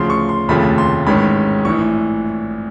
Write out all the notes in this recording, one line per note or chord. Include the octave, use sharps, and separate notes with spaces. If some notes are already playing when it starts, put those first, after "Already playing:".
Already playing: D2 C#3 F3 C6
C#6
C6
F1 D#2 C#3 F3 A3 B5
C6
A1 G#2 D#3 G#3 C#4 B5
A#1 A2 E3 C#6